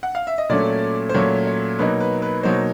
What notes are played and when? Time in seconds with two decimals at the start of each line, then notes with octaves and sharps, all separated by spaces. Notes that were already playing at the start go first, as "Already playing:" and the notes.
0.03 F#5
0.15 F5
0.27 E5
0.38 D#5
0.49 A#2 F#3 A3 C#4 D5
1.09 C5
1.14 A#2 F#3 A3 C#4 C#5
1.47 C#5
1.79 B2 F#3 A#3 D#4 B4
2.00 B4
2.22 B4
2.43 B2 F#3 A#3 D#4 C5